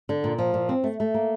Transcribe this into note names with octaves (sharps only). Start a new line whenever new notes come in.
D3
A#2
F3
A#2
C4
A3
A3
A#3